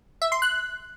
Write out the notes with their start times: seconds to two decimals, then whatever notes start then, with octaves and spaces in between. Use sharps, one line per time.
0.22 E5
0.32 C6
0.42 F#6